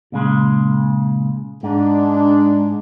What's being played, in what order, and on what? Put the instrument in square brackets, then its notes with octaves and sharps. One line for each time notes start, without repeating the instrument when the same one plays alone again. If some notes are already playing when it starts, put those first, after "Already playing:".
[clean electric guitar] A#2 C#3 G#3
[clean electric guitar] G#2 [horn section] G#3 D4